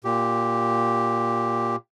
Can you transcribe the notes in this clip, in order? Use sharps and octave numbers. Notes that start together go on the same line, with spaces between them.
A#2 G4